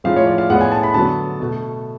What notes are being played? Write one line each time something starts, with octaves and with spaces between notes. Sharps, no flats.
A2 F3 G#3 F5
C#5
D5
F5
A2 G#3 B3 F#5
G#5
A5
B5
D3 F#3 B3 A5
B2 A3